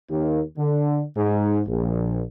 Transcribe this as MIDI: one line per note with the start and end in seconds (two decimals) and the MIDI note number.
0.10 0.41 39
0.58 1.03 50
1.17 1.62 44
1.67 2.21 34